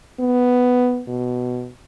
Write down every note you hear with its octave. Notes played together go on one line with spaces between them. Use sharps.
B3
B2